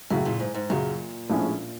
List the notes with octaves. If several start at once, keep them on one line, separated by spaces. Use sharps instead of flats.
F#2 A2 C#3 F#3
A#2
G#2
G#2
F#2 A#2 C#3 F#3
A#1 A2 F3 G#3 C#4